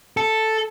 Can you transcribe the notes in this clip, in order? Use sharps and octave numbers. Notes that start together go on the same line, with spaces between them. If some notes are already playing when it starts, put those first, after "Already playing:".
A4